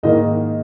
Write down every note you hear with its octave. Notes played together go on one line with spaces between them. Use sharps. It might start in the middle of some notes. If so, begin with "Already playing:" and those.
G#2 D#3 A#3 D#5